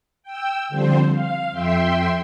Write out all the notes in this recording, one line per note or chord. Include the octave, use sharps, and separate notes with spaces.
G5 E6
D3 F3 G3 C4 C5
F5
F2 E5 G5 C6